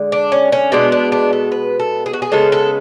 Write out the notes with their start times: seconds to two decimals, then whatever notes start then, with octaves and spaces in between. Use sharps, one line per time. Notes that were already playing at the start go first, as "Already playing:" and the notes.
Already playing: D3 G#3
0.12 D4
0.32 C#4
0.52 C#4
0.72 B2 G#3 B3 D4
0.92 D4
1.12 D4
1.33 A4
1.52 B4
1.79 A4
2.06 G#4
2.13 F#4
2.22 G#4
2.32 C#3 G#3 B3 A4
2.52 A4